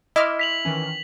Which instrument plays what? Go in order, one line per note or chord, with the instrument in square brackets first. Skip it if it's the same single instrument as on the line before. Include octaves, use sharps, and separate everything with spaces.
[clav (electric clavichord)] E4 [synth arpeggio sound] D#5 D6 F6 [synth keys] E5 C6
[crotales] B6 F7 F#7
[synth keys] D#3 E3 C#4